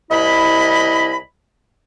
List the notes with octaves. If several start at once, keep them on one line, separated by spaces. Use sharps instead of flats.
C2 E4 D#5 B5